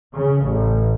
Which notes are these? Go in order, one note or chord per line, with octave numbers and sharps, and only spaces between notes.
C#3
A1